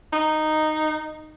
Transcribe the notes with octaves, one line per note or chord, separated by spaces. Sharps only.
D#4